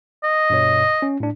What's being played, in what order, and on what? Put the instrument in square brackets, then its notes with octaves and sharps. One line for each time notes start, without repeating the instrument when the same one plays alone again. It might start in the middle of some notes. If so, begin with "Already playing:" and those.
[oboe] D#5
[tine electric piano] G2 B2 C#5
C#4
A2 D4